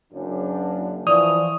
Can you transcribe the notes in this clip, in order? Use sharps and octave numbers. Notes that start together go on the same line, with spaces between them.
F#1 F#2 D4
E3 F3 D5 C#6 D#6 F7